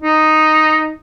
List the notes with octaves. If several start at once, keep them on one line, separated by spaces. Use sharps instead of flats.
D#4